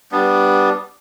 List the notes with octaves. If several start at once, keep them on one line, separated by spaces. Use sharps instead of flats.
G3 B3 D4